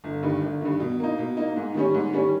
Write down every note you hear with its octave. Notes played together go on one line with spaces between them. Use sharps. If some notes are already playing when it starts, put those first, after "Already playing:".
G1
G2 D#3
G1
G2 D#3
B2
A#3 D#4
B2
A#3 D#4
G#2
D#3 G3 C#4
G#2
D#3 G3 C#4